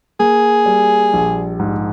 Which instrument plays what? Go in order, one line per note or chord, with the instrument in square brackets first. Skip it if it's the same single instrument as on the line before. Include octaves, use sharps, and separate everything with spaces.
[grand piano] A#3 [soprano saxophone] G#4
[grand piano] G3
A#1
G#2